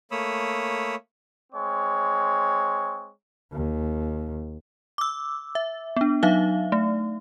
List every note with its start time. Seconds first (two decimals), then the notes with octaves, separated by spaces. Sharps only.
0.11 A3 A#3 C#5 B5 D#6 E6
1.53 G#3 C4 C#5
3.53 D#2
4.98 D6 E6
5.55 E5
5.96 B3 D4
6.23 F#3 D#4 E5 F5
6.72 A3